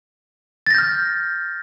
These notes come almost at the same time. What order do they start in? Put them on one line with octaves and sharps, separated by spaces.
A6 A#6 G6 F6